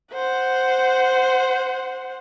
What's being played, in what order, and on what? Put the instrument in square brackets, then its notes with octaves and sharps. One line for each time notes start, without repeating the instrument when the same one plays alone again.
[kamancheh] C5 F#5